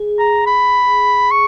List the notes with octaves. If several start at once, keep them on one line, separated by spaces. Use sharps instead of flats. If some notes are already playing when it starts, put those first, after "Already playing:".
Already playing: G#4
A#5
B5
C#6